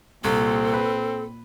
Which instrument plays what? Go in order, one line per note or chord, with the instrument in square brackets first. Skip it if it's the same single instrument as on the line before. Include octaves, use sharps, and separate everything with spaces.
[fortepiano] C2 [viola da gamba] A#2 [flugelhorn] C4 [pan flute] A4
[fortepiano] B4